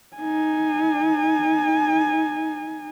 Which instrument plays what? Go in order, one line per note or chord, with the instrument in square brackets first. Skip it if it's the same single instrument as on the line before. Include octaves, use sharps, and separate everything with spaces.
[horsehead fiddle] D#4 G#5